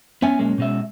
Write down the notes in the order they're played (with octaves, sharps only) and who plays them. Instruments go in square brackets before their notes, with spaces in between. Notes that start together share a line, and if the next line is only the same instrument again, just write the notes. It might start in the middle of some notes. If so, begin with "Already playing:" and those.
[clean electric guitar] B3 E5 G#5 [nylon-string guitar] C#4
[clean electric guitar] B1 G#3 A#3
B2 G#3 E5